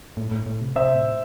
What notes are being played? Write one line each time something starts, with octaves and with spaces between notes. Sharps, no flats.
A2
A2
A2
C3
C3 C5 E5
A2